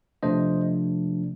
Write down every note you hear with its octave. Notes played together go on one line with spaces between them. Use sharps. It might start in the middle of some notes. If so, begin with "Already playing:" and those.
C3 F3 A3 D4 C5 D#5